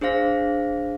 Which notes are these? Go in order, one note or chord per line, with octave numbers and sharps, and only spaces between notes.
D4 G#4 C5 F5 A#6